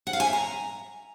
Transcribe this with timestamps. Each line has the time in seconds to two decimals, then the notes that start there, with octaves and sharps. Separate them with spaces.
0.07 F#5
0.13 F5
0.20 G#5
0.26 E5
0.33 A#5